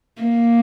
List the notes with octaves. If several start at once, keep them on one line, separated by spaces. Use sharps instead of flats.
A#3